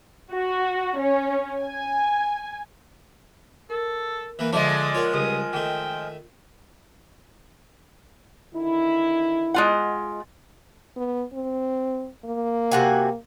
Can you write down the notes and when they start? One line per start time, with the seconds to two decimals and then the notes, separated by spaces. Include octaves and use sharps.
0.33 F#4
0.97 C#4
1.60 G#5
3.70 A4 A#4
4.39 E3 A#3 B4
4.53 D3 F3 G#3 D5 E5 B5
4.94 F4 A#4 C#5 F#5
5.13 C#2 G2 D#6
5.53 D#3 A3 G5
8.55 D3 D#3 E4
9.54 G#3 F4 F#5
10.97 B3
11.33 C4
12.25 A#3
12.71 C3 F#4 G#5